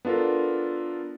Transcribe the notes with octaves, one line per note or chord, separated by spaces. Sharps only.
B3 D4 F4 A4 A#4